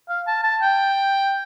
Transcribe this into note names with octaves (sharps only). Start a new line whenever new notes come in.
F5
A5
A5
G5